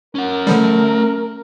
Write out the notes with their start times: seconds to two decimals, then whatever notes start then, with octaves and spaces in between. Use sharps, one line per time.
0.15 C#4 A#4 F#5
0.47 D3 F3 G3 A3